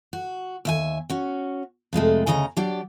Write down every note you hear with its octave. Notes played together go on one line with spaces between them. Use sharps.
F#4
D#2 E5 G#5
C#4 F#4
F2 C3 G#3 A3
D2 C#3 C#4 D#5 G#5 A#5
F#3 D4 G4 D5